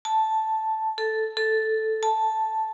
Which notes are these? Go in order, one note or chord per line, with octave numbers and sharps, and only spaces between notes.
A5
A4
A4
A5